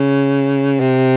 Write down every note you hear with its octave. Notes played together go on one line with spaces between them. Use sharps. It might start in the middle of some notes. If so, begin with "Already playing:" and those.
Already playing: C#3
C3